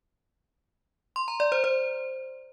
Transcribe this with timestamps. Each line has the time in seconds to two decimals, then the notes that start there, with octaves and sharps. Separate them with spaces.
1.16 C6
1.28 A#5
1.40 D5
1.52 C5
1.64 C5